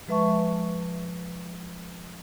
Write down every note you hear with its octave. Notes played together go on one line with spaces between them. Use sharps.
F3 G#3 B4 E5 A5 C#6